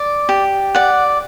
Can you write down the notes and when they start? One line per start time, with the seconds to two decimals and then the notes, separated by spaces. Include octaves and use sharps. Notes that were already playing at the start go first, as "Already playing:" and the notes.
Already playing: D5
0.29 G4
0.75 D5 F#5